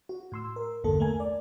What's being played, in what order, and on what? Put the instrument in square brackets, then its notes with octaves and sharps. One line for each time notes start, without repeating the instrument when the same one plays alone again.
[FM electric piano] F#4
A2 C6 E6
A#4
A#1 E2 G2 D3 A#3 A4
A3 A#3 A#4 G#5
D5